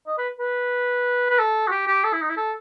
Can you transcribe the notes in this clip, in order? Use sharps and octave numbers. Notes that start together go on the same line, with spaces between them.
D#5
B4
B4
B4
A4
F#4
G4
G4
A4
E4
D#4
E4
A4